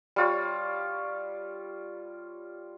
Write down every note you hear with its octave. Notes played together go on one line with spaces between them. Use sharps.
G3 F4 C#5